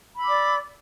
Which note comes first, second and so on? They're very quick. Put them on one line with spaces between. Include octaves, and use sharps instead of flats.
B5 E6 D6 D5